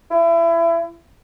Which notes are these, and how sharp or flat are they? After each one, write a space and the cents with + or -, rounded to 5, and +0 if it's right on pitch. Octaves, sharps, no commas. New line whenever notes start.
E4 +30